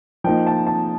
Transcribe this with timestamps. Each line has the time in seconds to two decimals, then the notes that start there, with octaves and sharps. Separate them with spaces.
0.24 F3 A#3 D#4 G5
0.47 A5
0.67 A5